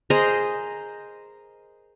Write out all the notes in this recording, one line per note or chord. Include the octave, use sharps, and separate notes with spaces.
G#4 A#4 C5 D#5